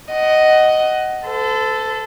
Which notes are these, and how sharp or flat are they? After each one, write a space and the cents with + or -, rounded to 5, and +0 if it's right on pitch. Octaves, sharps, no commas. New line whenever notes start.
D#5 +0 F#5 +20
A4 +0 C5 -45